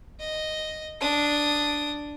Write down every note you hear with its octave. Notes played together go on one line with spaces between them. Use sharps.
D#5
D4 D#6